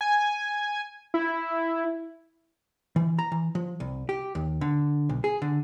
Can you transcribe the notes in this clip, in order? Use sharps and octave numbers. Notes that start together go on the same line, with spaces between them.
G#5
E4
E3
A#5
E3
F3
C2
G4
D#2
D3
B1
G#4
D3